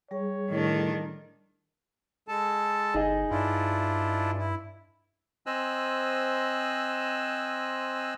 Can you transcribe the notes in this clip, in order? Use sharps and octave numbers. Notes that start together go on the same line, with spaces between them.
G3 G#4 C#5
A2 D#3 D4
G#3 A4 A5
G1 D#4 G#4 D#5
G2 D4 E4 F4
E4
C4 C5 D#5 G#5 E6 F#6